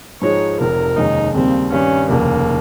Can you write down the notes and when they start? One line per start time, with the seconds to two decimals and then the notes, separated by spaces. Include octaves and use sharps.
0.21 G#2 F3 G#3 D#4 C#5
0.60 F1 F2 C3 A#4
0.97 F1 D#2 D#3 G#3 C#4 D#4
1.34 D#2 C#3 G3 A#3 C4
1.72 G2 D#3 G3 C#4
2.10 F1 D#2 C#3 A#3